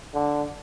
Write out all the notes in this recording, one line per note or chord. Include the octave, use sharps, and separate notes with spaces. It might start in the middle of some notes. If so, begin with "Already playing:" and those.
D3